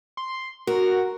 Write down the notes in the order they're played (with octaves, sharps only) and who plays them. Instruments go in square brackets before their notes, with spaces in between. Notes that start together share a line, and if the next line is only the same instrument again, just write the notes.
[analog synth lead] C6
[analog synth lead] F#4 [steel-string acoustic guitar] A#4